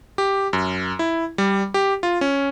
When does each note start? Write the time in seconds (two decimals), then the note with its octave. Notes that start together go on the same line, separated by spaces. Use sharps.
0.18 G4
0.53 F#2
0.99 E4
1.38 G3
1.74 G4
2.03 F4
2.21 C#4